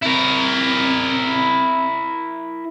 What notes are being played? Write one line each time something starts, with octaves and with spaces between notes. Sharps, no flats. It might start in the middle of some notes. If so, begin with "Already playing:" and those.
C4 E4 A#4